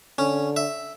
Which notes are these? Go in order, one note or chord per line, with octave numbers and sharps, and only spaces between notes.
D3 C#4
E5